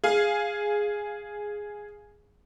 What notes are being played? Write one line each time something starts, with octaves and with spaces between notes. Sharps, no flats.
G#4 F5